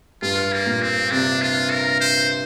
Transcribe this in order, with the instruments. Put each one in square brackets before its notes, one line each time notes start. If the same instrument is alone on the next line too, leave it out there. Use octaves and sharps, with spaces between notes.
[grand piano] G2 [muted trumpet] F4
[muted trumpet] A#3
[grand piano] A#2
[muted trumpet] C4
[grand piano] C3 [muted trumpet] D4
[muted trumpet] F4
A#4
C5